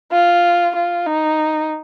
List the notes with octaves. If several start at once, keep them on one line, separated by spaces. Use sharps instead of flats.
F4
F4
D#4